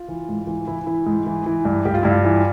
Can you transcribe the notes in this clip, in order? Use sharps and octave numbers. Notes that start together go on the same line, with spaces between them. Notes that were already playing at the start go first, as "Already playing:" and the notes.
Already playing: F4
E3
G#2
E3
E3 E4
E3 E4
G#2
E3
E3
G2
G2 G4
F4
G2 E4
F4
E3